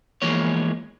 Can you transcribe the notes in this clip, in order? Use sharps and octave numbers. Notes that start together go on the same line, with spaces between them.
E2 E3 F3 G#3 A#3 C#5